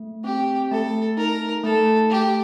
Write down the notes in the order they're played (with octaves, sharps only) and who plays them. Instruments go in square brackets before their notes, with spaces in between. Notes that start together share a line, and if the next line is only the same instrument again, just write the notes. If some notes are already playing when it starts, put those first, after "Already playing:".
Already playing: [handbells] A3
[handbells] C4 [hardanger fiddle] G4
[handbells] A3 [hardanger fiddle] A4
[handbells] D#4 [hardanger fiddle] A#4
[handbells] A3 [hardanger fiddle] A4
[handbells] A3 [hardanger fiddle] G4